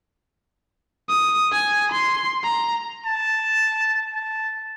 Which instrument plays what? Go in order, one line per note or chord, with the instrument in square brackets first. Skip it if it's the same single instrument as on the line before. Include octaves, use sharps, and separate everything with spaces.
[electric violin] D#6
G#5
C6
A#5
[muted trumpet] A5
A5